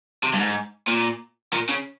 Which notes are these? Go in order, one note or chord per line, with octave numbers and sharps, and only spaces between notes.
C3
G2
G#2
A#2
A#2
C#3